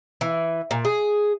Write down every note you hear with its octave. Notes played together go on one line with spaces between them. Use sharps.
E3
A#2
G#4